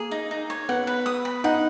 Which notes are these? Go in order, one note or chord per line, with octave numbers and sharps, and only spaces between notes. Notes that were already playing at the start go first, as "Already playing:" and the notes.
Already playing: A#3 G#4
D#4
D#4
C#5
B3 F#5
B4
D#6
B5
D#4 F#5